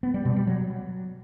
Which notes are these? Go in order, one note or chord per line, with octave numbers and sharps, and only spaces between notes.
B3
G3
B2
G3
F#3